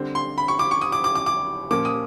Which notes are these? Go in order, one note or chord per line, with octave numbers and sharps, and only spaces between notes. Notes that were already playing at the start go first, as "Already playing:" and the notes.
Already playing: D3 G3 C4
C6
B5
C#6
D6
C#6
D#6
D6
D6
D6
D6
A#2 F3 A#3 C#4 D6
D#6